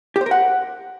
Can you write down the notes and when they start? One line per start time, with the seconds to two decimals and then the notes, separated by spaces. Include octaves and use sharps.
0.16 G4
0.21 C5
0.26 A#4
0.31 F#5